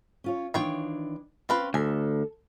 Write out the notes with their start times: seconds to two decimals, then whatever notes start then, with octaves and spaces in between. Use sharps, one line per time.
0.24 C#4 F4 C#5
0.54 D#3 E3 D4 F4 C#5 G5
1.49 C4 C#4 F4 B4
1.74 D2 A4 G#5 A5